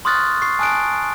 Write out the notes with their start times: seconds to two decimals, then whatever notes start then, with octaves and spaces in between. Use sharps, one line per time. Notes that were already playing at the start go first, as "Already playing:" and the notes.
0.05 C6 C#6 D#6 F6 F#6 A6
0.42 C#6 C7
0.59 G#5 A5 D#6 F#6 D7